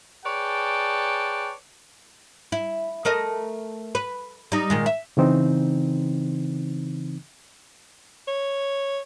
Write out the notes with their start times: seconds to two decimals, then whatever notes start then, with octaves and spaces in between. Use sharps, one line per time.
0.25 G#4 B4 C#5 D5 G5 A5
2.52 E4
3.05 A3 A#4 D#5
3.95 B4
4.52 G3 D#4
4.70 A#2 D#3 G#3
4.86 E5
5.17 C#3 E3 C4 D#4
8.28 C#5